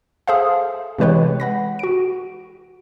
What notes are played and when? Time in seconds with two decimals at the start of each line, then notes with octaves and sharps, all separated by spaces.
0.27 G#4 A4 C5 E5 F5
0.98 C3 E3 G#3 B4 C#5 G5
1.40 F#5 B5 A#6
1.79 F#4 D7